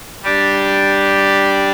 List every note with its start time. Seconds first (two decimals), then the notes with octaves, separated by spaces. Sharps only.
0.23 G3 D4 G4 D5